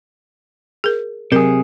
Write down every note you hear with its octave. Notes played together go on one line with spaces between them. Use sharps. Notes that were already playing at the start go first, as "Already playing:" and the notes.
G#4 A#4
C3 F#3 G#4 A#4